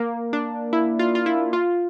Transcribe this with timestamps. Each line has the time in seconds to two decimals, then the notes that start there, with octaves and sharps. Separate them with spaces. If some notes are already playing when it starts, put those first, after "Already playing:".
Already playing: A#3
0.33 D4
0.73 E4
0.99 F4
1.15 F4
1.26 E4
1.53 F4